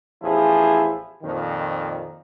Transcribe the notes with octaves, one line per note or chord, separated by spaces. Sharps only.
A1 E2 F3 E4 G#4
F2 A#2 D#3